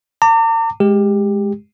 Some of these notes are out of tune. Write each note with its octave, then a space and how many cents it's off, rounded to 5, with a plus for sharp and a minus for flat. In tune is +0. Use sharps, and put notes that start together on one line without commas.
A#5 -45 D6 +0
G#3 +0 G4 +15